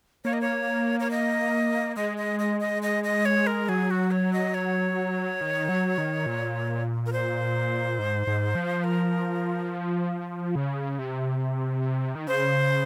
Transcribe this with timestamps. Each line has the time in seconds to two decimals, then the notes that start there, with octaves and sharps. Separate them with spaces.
0.25 A#3 C#5
0.33 D#5
0.41 C#5
1.00 C#5
1.11 D#5
1.96 G#3 D#5
2.17 D#5
2.39 D#5
2.60 D#5
2.83 D#5
3.04 D#5
3.25 C#5
3.47 A#4
3.69 F#3 G#4
3.91 F#4
4.11 C#5
4.33 D#5
4.54 C#5
5.41 D#3
5.69 F#3
5.98 D#3
6.26 A#2
7.06 A#4
7.12 C5
7.99 G#2
8.27 G#2
8.55 F3
8.84 A#4
10.55 C#3
10.99 C3
12.15 D#3
12.27 C#3 C5